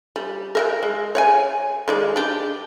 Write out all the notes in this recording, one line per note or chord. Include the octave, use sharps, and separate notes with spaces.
G3
A#4 E5 G5
G#3
C#5 F#5 G#5
D#3 G#3 D5
D4 G4